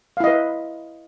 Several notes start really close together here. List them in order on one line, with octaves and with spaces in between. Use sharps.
F5 E4 D#5 B4